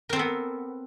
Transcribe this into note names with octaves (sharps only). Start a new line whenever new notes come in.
B3 C4 A4 A#4